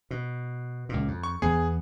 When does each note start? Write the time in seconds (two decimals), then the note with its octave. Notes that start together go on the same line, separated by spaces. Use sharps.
0.11 B2
0.89 C#2 A#2
1.08 F2
1.23 C#6
1.42 E2 B3 G#4